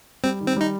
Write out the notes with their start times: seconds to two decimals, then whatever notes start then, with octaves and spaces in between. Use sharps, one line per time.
0.24 G3 C4
0.40 D#3
0.48 C4
0.57 G3 D#4